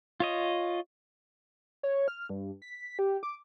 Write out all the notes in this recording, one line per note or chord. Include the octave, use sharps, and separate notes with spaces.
F4 C#5 D#5
C#5
F6
G2
B6
G4
D6